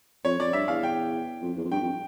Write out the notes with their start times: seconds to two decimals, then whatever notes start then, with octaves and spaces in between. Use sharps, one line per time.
0.24 F2 C#5
0.39 F2 D5
0.53 G2 E5
0.68 E2 F5
0.83 G5
1.42 F2
1.57 E2
1.65 F2
1.71 G2 G5
1.81 F2